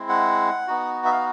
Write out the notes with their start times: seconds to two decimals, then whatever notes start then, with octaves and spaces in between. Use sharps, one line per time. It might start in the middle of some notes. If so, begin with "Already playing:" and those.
Already playing: G#3 C4 E4
0.09 F#5
0.68 B3 D#4 F#4
1.05 E5
1.12 F5